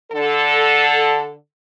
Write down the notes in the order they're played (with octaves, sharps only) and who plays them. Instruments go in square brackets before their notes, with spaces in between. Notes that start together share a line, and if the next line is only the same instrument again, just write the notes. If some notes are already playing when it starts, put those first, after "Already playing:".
[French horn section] D3 A4